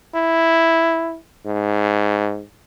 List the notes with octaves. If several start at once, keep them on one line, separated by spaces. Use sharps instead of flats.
E4
G#2